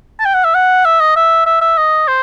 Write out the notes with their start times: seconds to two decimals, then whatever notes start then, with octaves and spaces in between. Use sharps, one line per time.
0.19 A5
0.25 G5
0.34 F#5
0.44 E5
0.54 F#5
0.85 E5
1.00 D#5
1.16 E5
1.46 E5
1.61 E5
1.77 D#5
2.07 C5